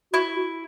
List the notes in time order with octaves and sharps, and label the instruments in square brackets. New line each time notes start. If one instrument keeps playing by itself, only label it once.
[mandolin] E4 [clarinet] F#4
[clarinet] F#4